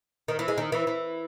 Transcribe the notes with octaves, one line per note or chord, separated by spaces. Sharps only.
D#3
E3
G#3
D#3
E3
E3